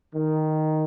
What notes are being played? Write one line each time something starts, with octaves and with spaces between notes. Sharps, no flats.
D#3